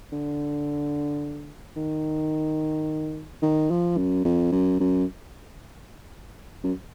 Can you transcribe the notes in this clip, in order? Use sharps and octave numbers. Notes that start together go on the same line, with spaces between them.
D3
D#3
D#3
F3
F#2
F2
F#2
F#2
F#2